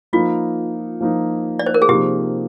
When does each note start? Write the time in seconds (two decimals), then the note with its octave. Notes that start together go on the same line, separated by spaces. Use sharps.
0.13 F3 A#3 D#4 F4
1.01 F3 A#3 D#4
1.59 D5
1.66 C5
1.74 A#4
1.82 G#4
1.88 C3 F3 A#3 D#4 G4